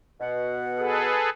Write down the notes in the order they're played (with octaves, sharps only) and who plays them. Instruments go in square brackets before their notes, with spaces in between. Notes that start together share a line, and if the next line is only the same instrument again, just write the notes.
[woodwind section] B2 F#5
[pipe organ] G#4 A4 B4